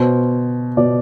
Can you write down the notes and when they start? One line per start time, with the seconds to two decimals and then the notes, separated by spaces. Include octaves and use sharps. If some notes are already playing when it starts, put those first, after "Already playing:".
Already playing: B2 C5
0.77 B2 D5